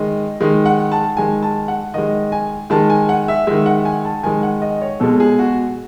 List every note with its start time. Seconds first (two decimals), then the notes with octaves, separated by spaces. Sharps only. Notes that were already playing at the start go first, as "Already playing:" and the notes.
Already playing: D#3 G#3 D#5
0.41 D#3 G#3
0.66 F#5
0.92 A5
1.17 D#3 G#3 G#5
1.42 A5
1.68 F#5
1.94 D#3 G#3 D#5
2.32 G#5
2.70 D#3 G#3 A5
2.90 G#5
3.09 F#5
3.28 E5
3.47 D#3 G#3 E5
3.66 F#5
3.85 G#5
4.05 A5
4.23 D#3 G#3 G#5
4.43 F#5
4.62 D#5
4.81 C#5
5.00 B2 G#3 A4
5.20 G#4
5.39 F#4